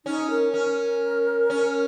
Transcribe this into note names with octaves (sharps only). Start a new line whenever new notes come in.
C#4 D#4
A#4
C#4 A#4
C#4